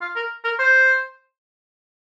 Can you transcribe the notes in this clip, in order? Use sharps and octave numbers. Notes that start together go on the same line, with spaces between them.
F4
A#4
A#4
C5